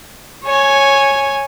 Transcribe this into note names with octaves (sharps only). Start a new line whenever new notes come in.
C#5 G#5